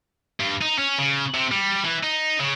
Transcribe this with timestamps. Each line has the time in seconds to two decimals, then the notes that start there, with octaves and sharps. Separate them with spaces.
0.40 G2
0.61 D#4
0.78 C#4
0.99 C#3
1.34 C3
1.51 G3
1.85 E3
2.03 D#4
2.40 C#3